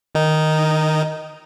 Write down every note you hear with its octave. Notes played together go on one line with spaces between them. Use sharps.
D#3 D#4